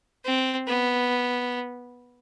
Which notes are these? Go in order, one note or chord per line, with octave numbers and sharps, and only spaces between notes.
C4
B3